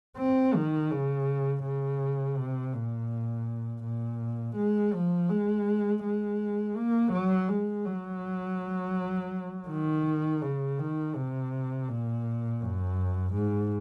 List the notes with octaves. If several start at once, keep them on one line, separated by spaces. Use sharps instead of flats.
C4
D#3
C#3
C#3
C3
A#2
A#2
G#3
F3
G#3
G#3
A#3
F#3
G#3
F#3
D#3
C#3
D#3
C3
A#2
F#2
G#2